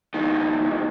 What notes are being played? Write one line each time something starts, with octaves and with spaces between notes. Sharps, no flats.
C#2 D#3